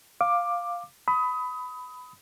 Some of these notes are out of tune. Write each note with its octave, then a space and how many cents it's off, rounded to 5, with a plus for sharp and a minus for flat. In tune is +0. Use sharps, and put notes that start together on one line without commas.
F5 +0 D6 +10
B5 +15 D#6 +25